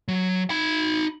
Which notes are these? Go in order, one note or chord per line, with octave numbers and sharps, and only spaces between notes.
F#3
D#4 B5